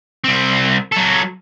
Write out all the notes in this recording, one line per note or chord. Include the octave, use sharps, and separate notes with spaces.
C2 C4
F#3 A4